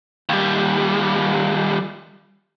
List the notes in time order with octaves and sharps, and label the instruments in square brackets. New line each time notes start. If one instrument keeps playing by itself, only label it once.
[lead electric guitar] D#2 G3